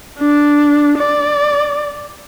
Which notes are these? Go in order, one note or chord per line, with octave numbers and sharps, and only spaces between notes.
D4
D5